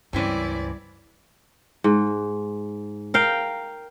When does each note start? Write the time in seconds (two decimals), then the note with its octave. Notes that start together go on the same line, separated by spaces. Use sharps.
0.13 C#2 G2 E3 C4 C#4 E4 D5
1.84 G#2
3.14 A#4 F5 G5